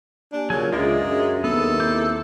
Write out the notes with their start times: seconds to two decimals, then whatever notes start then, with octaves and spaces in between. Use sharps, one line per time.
0.32 A#3 D4 G4 G#5
0.50 C#3 F#3 C#4 F4 A#4 G#5
0.72 C#2 G#3 D4 F4 G#4 A#4 D5 E5
1.00 F#2
1.44 D#2 B3 A4
1.80 C4 E4 E5 D6 G6